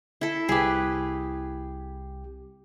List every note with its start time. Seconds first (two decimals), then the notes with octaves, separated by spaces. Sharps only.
0.21 E4 A4
0.49 C2 G4 G#4 B4